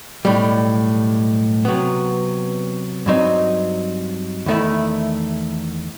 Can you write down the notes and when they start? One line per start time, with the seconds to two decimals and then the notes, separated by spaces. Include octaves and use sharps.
0.25 B1 A2 G3
1.65 C3 F#3 B3
3.06 G2 F#3 C4 D#4
4.46 E2 D#3 A3 E4